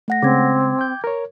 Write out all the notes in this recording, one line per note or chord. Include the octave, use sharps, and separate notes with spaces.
A3 F#5 A#6
C#3 G#3 C4 D6 G#6
G5 G6
A#4 C#5